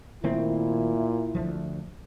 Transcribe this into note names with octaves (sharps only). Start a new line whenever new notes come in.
A#2 D#3 A3 C4 E4
D2 F3